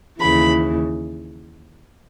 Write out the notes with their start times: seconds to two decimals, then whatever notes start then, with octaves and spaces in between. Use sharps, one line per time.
0.19 D#2 C#3 E3 B5